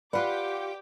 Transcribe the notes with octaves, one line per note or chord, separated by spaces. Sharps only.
F4 G4 B4 D5 F#5 G5 D6